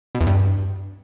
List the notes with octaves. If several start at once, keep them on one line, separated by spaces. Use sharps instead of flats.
B2
E2
G2